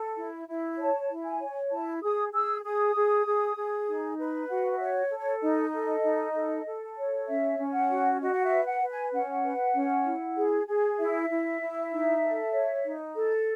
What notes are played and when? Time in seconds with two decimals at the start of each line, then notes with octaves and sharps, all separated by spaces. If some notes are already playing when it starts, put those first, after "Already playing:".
Already playing: A4
0.17 E4
0.48 E4
0.79 C#5 A5
1.10 E4
1.25 G#5
1.41 C#5
1.72 E4 A5
2.03 G#4 D#6
2.33 G#4 E6
2.64 G#4 D#6
2.96 G#4
3.26 G#4
3.57 G#4
3.88 D#4
4.19 B4
4.49 F#4 F#5
4.73 E5
4.81 C#5
5.11 A4
5.19 C#5
5.43 D#4 D#5
5.74 A4
6.04 D#4
6.35 A4
6.66 A4
6.97 C#5
7.27 C#4 E5
7.59 C#4
7.74 F#5
7.89 F#4
8.21 F#4 D#5
8.33 F#5
8.44 E5
8.52 B4
8.67 F#5
8.82 B4
8.90 G#5
9.13 C#4 F#5
9.44 B4
9.75 C#4
10.06 E4
10.37 G#4
10.68 G#4
10.99 E4 E5
11.30 E4
11.61 E4
11.92 D#4
12.23 A4
12.53 C#5
12.84 D#4
13.16 A4